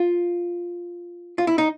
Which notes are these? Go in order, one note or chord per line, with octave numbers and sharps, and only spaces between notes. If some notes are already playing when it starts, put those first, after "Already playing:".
Already playing: F4
F4
E4
D#4